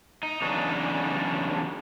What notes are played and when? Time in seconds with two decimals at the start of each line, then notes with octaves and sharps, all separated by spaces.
0.23 D#4
0.42 E2 C#3 F#3 D4 D#4